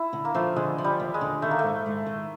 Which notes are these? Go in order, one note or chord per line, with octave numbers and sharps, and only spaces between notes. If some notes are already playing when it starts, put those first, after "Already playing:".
Already playing: E4
D3
A#3
F3 A3
D3 G#3
F3
G3
D#2
G#3
D3
D#3 A3
A#3
G#2 A3
G#3
D#3